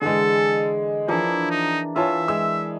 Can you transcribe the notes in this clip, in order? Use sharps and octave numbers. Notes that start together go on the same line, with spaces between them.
D3 E3 G#3 G#4 A4 D#5
E3 F3 D4 E4 A#4
D#4
E3 F4 C#5 E5 A5
G#3 E6